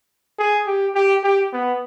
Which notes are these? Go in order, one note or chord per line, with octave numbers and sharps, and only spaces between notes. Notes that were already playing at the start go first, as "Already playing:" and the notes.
G#4
G4
G4
G4
B3